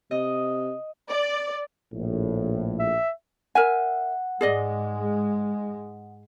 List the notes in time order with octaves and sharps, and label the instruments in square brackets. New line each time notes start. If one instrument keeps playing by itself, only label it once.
[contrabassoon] C3 [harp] D#5
[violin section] D5
[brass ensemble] A#1 A2
[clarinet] E5
[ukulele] A#4 E5 G#5 [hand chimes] F#5
[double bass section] G#2 G#3 [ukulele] G#4 D5 D#5